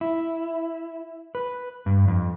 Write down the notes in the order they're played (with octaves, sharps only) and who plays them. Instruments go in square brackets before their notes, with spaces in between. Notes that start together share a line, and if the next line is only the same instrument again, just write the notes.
[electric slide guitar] E4
B4
G2
F2